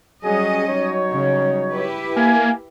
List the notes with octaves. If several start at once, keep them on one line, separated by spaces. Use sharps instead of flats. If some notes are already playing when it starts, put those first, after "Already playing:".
F#3 G3 C#4 G#4 D#5
F#3 D#4 C#5
C#3 G3
E4 G4 B4
A#3 E5 F5 G#5